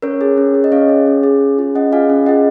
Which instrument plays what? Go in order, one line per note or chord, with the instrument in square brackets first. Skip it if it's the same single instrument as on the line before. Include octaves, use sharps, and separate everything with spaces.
[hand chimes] C#4 A#4 C#5
G#4
C#4
G#4
D#5
C#4 C#5 F5
G#4
C#4
G#4
C#4
F4 G#4
C#4 D#5 F#5
F4 G#4 F5 G#5
C#4
F4 G#4 D#5 F#5